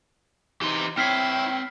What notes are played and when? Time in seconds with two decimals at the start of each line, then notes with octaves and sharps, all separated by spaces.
0.62 E3 D#4 G4 C6
0.98 C4 E4 C#5 G5 F6 B6 C7